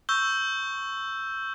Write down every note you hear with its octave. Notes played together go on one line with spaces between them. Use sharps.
C#6 E6 G6 G7